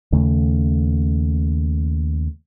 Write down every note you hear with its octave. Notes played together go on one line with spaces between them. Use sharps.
D#2 C#3 A3